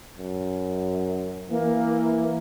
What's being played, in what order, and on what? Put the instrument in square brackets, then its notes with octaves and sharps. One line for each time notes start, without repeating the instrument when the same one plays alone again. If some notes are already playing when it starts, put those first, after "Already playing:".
[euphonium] F#2
[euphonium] E3 [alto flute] A#3